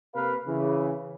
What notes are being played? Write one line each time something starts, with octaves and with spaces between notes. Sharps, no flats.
C3 A#3 A#4 B4 F5
C#3 E3